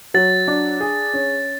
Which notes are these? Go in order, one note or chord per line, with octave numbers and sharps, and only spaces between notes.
F#3 A6
D4
G#4
C#4